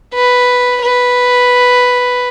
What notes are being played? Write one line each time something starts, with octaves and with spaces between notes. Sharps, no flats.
B4
B4